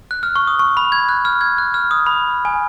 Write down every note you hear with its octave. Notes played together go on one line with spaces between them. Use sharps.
F#6
F6
C#6
D#6
C#6
B5
G#6
F#6
F6
G#6
F#6
F6
D#6
B5
G#5